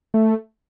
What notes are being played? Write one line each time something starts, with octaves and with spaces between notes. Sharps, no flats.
A3